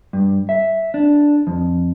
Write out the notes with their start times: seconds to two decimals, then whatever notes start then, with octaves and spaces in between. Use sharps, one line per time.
0.13 G2
0.49 E5
0.94 D4
1.47 F2